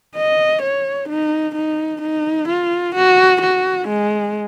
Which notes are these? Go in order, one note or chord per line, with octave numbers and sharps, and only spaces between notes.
D#5
C#5
D#4
D#4
D#4
F4
F#4
F#4
G#3